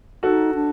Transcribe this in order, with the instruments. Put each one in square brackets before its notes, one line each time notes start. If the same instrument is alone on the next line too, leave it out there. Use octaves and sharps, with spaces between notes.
[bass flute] D#4 [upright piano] F#4 A4
[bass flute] D4